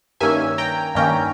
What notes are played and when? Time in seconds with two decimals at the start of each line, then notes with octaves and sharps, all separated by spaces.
0.20 G2 D#3 A#3 C#4 E5 G#5
0.58 G5 A#5
0.95 G2 D#3 A#3 C#4 G5 A#5